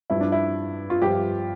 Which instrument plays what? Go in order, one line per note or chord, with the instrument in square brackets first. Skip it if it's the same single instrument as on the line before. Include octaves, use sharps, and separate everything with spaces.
[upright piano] G2 F3 E4
D4
E4
F4
G2 F3 G4